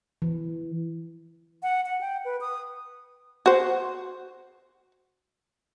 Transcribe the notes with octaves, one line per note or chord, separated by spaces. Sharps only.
E3
F#5
F#5
G5
B4
D#6
F#4 C5